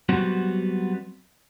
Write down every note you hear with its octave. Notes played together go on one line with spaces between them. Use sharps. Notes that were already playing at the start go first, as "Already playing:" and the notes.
F#3 G3 B3 C4 F#4